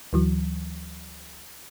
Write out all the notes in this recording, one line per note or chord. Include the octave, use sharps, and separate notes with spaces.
D2 E3 F#3